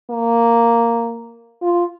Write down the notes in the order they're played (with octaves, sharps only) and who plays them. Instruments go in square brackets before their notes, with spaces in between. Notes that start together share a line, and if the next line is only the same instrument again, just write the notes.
[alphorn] A#3
F4